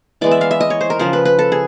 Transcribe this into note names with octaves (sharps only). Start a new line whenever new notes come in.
E3 G#3 B3 D5
E5
F5
E5
D#5
C#5
C5
A#4
C#3 F3 G#3 C5
B4
B4
A4
G#4